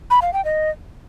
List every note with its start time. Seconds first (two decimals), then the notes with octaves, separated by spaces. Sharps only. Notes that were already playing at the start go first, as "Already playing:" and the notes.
0.11 B5
0.22 F5
0.33 G5
0.45 D#5